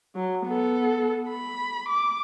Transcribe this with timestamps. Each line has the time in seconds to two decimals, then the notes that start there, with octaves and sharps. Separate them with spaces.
0.15 F#3
0.46 B3 A4
1.30 B5
1.89 D6